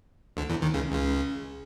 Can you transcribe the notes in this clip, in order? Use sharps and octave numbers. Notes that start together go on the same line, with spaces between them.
D2 D3
E2 E3
D#2 D#3
C#2 C#3
C#2 C#3